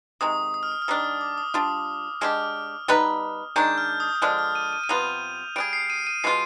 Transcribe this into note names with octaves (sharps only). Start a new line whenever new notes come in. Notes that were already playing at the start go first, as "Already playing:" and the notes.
C3 D#3 G#3 D#6
D#6
F6
D#6
F6
D#3 G3 D4 D#6
D#6
D6
D#6
G3 D4 F4 D#6
G#3 D4 G4 F6
G3 B3 D#4 B4
D#3 G#3 D4 G6
F6
D#6
D#6
D3 F3 G#3 D4 F6
F6
D#7
D#7
D#7
C3 G3 B3 F4 F7
G3 D4 G#4 D7
C7
D#7
D#7
B2 G#3 D4 F4 C7